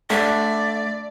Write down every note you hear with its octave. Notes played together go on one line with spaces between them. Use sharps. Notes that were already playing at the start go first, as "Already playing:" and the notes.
D3 A3 D5 E5